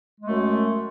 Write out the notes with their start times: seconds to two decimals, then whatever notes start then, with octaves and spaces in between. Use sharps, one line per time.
0.20 G#3
0.25 A3
0.29 F#2